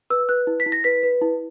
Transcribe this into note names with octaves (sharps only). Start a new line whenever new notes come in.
B4 E6
B4 F#6
E4
B6
E4
A#6
B4 B6
B4
E4